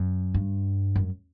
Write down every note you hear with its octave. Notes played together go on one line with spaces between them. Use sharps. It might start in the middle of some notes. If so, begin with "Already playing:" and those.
Already playing: F#2
G2
F#2